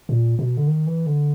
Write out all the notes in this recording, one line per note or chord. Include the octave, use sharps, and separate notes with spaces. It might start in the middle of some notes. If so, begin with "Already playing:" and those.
A#2
B2
D3
D#3
E3
D3